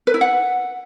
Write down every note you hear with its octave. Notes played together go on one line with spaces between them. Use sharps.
B4
E4
F#5